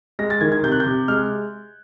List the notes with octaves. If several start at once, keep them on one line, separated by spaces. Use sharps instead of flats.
G#3 A#6
A6
D#3 G#6
G#6
C3 G6
F#6
G6
C3
G#3 F6